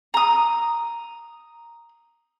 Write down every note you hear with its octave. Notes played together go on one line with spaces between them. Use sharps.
A#5 D#6